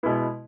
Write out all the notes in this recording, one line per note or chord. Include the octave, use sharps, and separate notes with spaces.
B2 G#3 B3 E4